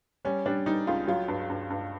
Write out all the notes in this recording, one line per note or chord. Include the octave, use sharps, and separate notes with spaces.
G3 C#4
G3 D4
G3 D#4
C#2 F4
F#3 F4
G2
G2
G2